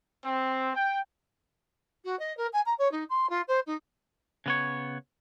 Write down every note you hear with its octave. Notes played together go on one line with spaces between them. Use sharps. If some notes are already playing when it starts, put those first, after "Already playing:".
C4
G5
F#4
D#5
A#4
G#5
A#5
C#5
D#4
C6
F4
C5
D#4
C#3 B3 C#5